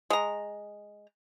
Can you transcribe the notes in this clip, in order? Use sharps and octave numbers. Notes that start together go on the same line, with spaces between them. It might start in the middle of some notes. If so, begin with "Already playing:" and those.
G#3 A#5